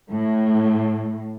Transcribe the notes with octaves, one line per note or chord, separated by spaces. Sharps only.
A2